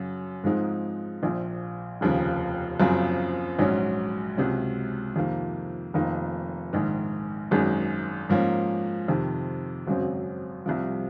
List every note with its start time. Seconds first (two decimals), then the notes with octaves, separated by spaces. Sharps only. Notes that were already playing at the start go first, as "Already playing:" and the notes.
Already playing: F#2 C#3 F#3 C#4
0.44 G#2 F3 G#3 C4 D#4
1.23 A#1 A#2 F3
2.01 F1 D#2 C#3 F3
2.80 F#1 F#2 C#3 F3 C4
3.59 A#1 G#2 F#3 C#4
4.37 C#2 C3 F#3
5.16 F2 C3 D#3 A#3
5.94 F1 F2 D#3 A#3 D#4
6.73 A#1 G#2 D#3
7.51 G#1 F#2 D#3 G#3
8.30 G#2 F3 A#3 C#4
9.08 F2 C3 D#3
9.87 G#1 F#2 C#3 F#3 C4
10.66 C2 C3 F3